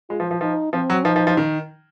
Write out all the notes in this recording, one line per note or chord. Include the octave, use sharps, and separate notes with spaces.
G#3 F4
F3
F3
F3 D#4
F3 C4
F#3
F3 D#4
F3
F3
D#3